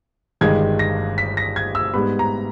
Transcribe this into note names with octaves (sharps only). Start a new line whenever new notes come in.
G1 G2 D#3 G#3 G#6
A#6
B6
A#6
G#6
E6
G#2 G3 B3 B5
A#5